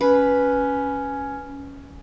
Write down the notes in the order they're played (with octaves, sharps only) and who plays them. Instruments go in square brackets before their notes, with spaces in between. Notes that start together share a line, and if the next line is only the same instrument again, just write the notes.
[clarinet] C#4 [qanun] B4